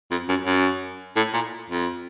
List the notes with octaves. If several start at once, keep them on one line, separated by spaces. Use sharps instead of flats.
F2
F#2
F#2
A2
A#2
F2